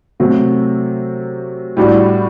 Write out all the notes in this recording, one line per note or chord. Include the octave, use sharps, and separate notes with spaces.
C3 F#3 A3 C4
A2 G3 D4 F#4